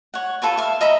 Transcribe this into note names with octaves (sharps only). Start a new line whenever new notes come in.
C#5 F#5
F4 A4 B4 C#5
E5 F5
D#5 E5 A#5 B5